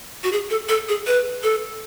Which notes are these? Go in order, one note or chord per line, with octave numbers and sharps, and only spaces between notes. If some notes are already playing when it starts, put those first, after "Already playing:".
F#4
G#4
A4
A4
G#4
B4
A4